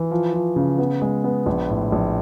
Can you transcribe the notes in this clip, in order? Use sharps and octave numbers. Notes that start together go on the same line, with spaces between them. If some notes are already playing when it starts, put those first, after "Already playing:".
Already playing: E3
F3
F3
C#3
B3
G#3
B3
A#1
A2
A#1